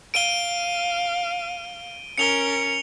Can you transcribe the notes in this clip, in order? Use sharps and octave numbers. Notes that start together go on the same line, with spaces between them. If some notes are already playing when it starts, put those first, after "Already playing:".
F5 D7 D#7 G7
C#4 A#4 C#7 F7 G7